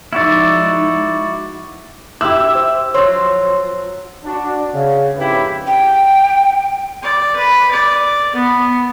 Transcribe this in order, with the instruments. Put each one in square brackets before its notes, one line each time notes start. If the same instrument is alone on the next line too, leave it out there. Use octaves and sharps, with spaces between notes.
[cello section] F3 G#3 D#4 [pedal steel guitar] E4 F#4 D5
[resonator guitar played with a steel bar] E4 G4 [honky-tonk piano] E6
[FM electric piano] C5 E5
[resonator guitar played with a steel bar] F3 F#3 [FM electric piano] C5 C#5 C6
[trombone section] D4 F#4
C#3
F2 G#2 C#3 E4 G4 B4
[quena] G5
[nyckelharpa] D5
B4
D5
B3